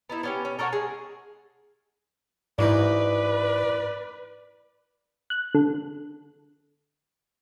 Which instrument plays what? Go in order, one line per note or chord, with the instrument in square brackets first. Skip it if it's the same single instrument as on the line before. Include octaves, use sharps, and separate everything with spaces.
[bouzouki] B3 D#4 E4
B3 C#4 G4
C#4
A4 A#4 C#5 F#5
G#3 G#4
[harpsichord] A1 E3 D#4 [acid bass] G#2 [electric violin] B4 [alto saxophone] D5
[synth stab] F#6
D3